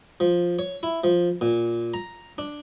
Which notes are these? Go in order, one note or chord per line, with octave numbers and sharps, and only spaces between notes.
F3
C#5
E4
F3
A#2
A#5
D4